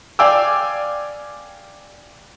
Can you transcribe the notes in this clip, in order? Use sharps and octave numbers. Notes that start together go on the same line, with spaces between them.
D5 F5 G5 G#5 D6 E6